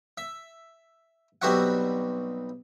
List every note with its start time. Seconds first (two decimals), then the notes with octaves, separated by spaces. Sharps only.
0.18 E5
1.42 B1 G3 C4 F#4 E5 F#5